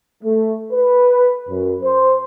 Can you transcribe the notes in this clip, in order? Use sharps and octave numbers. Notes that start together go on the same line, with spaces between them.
A3
B4
F#2
C5